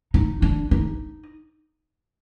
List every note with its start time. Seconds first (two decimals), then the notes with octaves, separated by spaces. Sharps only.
0.14 D#4
0.42 D4
0.71 D#4